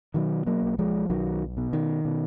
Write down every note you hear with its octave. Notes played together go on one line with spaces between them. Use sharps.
B2 D#3 F#3
F#3 A#3
B1
F3 G#3
B1 D#3 F#3
B2
D#3
B2